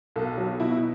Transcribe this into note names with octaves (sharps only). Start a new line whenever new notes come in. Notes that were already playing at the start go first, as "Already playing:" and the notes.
B1 A4
F#3
B2 E4